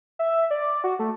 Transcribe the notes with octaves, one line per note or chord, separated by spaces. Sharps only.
E5
D5
F#4
A3